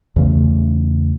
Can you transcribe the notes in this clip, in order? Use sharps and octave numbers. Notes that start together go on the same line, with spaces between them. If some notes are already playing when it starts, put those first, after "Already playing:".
E2 C#3 A3